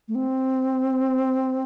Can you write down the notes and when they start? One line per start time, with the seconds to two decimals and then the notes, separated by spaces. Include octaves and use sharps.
0.08 A3
0.15 C4